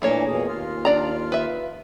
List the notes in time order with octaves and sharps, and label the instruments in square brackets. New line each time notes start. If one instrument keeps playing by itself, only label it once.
[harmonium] A#2 E3 D4 [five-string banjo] A3 A#3 C#5
[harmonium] F2 B2 G#4
D#2 F4
[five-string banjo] D4 D5 A#5
B4 E5